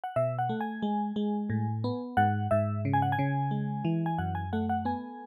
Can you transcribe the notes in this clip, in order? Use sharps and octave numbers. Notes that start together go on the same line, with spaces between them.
F#5
B2 E5
F#5
A3
G#5
G#3
G#3
A2
B3
G#2 F#5
G#2 E5
C#3
G#5
F#5
G#5
C#3
G#3
E3
G#5
F#2 F#5
G#5
A3 F#5
F#5
B3 G#5